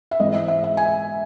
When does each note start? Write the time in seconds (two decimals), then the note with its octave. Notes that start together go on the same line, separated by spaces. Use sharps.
0.11 E5
0.20 G#2 E3 C4 D#5
0.34 E5
0.48 E5
0.64 E5
0.77 G#5